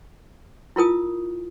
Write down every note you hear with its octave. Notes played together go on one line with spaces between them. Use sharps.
E4 F4 A#4 D#6